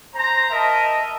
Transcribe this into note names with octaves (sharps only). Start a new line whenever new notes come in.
C5 A#5
A#4 D#5 E5 A5